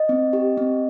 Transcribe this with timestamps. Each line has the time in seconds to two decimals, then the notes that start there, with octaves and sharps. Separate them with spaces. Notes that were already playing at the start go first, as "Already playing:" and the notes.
Already playing: D#5
0.09 C4
0.33 G4
0.57 C4